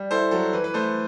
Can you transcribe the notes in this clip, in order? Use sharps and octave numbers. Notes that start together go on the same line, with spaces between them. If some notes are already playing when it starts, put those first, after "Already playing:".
Already playing: G3
E4 A4 C5
F#3 A4
E3 B4
B4
A3 A4 C5